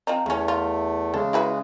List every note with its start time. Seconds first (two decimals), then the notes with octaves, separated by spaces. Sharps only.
0.07 F3 C4 D#4
0.26 E2 C#3 A3 C#4
0.48 F4
1.14 C#3 G#3 A4
1.33 E4 F#4 B4